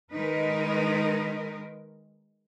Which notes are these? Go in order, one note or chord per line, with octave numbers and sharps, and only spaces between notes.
D#3 G#3 D#4 A#4 B4